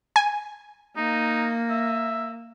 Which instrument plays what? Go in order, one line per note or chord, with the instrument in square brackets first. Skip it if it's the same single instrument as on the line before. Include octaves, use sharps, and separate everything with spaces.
[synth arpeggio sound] G#5
[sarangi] A#3 [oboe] D#4
[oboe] E5